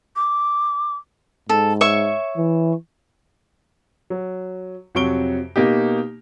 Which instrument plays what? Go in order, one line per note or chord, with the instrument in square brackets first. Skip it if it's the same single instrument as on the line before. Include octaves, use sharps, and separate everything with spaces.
[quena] D6
[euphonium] G#2 [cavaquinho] A4
[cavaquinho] C#5 E5 C#6
[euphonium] E3
[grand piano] F#3
F2 C3 F#3 C#6 D7 G7
B2 A#3 D#4 G4